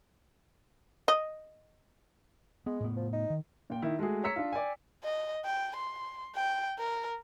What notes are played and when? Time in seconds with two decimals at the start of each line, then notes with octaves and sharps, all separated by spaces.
1.08 D#5
2.66 G#3 B3
2.80 A2 B3
2.96 F3
3.13 D#4
3.30 D#3
3.70 A#2 G5
3.82 D#3 E4
3.99 G#3 A3 F#4 G#4
4.24 C#5 A#5 E6 B6 C#7
4.36 D4 F4
4.53 D5 G5 G#5
5.04 D#5
5.45 G5
5.76 C6
6.36 G5
6.79 A#4